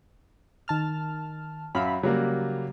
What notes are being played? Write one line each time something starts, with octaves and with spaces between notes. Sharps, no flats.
D#3 A5 F6
F#2 E5 F5 B5
C#3 F#3 G3 A#3